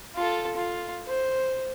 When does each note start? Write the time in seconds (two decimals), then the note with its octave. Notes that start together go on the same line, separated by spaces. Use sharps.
0.16 F4 A4
0.56 F4
1.07 C5